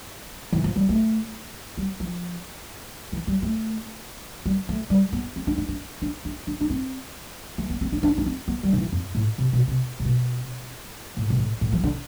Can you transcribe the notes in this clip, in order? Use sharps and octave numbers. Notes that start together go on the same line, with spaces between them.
E3
F3
G3
A3
G3
F3
E3
G3
A3
G3
A3
G3
B3
C4
D4
D4
D4
D4
D4
D4
D4
C4
A3
B3
C4
D4
D4
D4
C4
B3
G3
D3
E3
F2
A2
C3
B2
C3
C3
B2
A2
B2
A2
A2
F3
D3